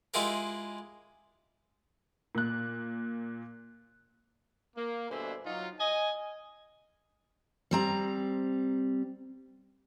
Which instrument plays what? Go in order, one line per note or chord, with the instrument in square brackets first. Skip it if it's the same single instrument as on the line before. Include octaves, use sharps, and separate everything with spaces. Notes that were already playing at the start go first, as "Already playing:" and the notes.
[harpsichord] G#3 E4 F4 G4 G#4 A#4
[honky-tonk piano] A#2 F#6
[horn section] A#3
G2 B2 D3 C5 E5 G#5
F#3 D#4 F4
D#5 G#5
[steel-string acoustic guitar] G3 C4 A#5